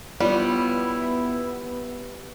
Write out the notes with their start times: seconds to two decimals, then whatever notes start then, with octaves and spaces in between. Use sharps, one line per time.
0.20 G3 B3 E4 F4 C#5 D5